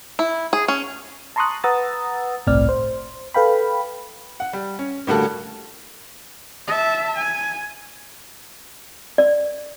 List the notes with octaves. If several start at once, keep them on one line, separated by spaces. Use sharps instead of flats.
E4
G#4
C#4
A5 A#5 C6 C#6 D#6 F#6
B4 F#5 A#5 D#6 E6 A6
G1 C2 A2 C4 D5 F6
C5
A4 B4 F5 G5 B5
F#5
G3
C#4
A2 D3 G3 A#3 F#4 A4
E5 A5
G#5
D5